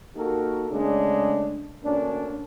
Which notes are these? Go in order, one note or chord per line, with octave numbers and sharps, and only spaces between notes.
A#3 D#4 F#4 G4 A4 A#4
C#3 G#3 A3 D4
D2 A#3 C#4 D4